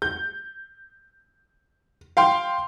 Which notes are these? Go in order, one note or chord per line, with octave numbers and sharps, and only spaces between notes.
G6
F5 G5 C6